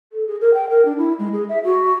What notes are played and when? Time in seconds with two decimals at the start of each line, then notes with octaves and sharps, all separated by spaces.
0.13 A4
0.27 G#4
0.41 A#4
0.54 G5
0.70 A#4
0.85 D4
0.98 E4
1.19 G#3
1.33 G#4
1.49 E5
1.65 F#4